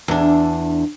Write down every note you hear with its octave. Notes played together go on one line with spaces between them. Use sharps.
E2 D4